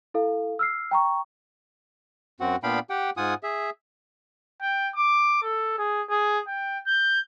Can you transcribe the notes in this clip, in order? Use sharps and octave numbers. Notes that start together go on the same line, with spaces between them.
E4 A4 F5
E6 F6 C7
G5 A#5 C#6
F#2 C4 F#4 F#5
A#2 B3 D4 F5 G5 B5
G4 F#5 G5
G#2 F4 F#5 G#5 D#6
G#4 E5
G5
D6
A4
G#4
G#4
G5
G6